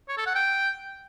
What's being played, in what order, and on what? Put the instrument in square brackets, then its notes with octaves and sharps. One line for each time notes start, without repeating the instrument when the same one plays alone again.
[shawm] C#5
A4
F#5
G5